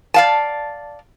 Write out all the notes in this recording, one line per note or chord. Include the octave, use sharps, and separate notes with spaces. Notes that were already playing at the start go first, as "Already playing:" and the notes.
D5 F5 A5